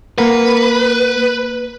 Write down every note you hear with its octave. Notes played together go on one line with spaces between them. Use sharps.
A#3 A#4 B4 F#5